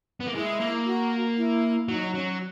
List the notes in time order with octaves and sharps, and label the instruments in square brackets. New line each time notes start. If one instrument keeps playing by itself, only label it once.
[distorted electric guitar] B3
A#3
[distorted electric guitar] G#3 [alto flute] E4
[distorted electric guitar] A#3
[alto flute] F#4
E4
[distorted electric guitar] F#3 [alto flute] D#4
[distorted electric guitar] F#3 [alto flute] C#4